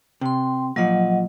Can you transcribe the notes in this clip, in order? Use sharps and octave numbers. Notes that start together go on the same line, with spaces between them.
C3 G5 C6
A#2 F3 F#3 D#5 F#5